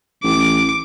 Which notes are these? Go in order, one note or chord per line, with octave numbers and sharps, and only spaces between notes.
A1 D6